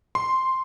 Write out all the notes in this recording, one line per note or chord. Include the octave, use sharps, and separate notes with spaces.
C6